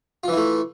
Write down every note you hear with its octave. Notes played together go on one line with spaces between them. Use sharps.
E3 A3 E4 F4